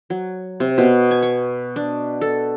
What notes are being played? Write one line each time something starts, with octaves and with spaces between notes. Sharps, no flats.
F#3
C3
B2
G#5
C#6
D4
A4